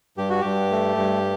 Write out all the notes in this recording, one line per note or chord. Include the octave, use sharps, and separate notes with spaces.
G2 G4
F#4
G2 G4
A3
G2